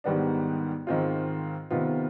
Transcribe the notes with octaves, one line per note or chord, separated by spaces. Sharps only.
G#2 D#3 G3 B3 D4
G#2 D#3 G#3 C4 F4
C3 D#3 B3 F4